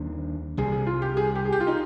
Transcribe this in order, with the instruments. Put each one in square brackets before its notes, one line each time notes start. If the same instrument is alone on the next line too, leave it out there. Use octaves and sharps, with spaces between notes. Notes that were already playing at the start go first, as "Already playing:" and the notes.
Already playing: [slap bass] D#2 D#3 G3 D4
[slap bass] C2 C3 G3 [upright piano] G#4
[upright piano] G#4
F4
G4
G#4
G4
G#4
G4
F4
D#4